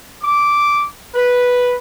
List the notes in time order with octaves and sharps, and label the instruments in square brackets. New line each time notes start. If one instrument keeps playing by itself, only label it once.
[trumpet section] D6
B4